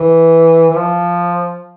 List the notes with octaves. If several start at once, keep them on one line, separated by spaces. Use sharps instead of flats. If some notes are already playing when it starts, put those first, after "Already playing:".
Already playing: E3
E3
F3